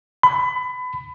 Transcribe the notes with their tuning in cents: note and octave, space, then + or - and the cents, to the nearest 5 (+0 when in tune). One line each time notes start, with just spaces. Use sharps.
B5 +25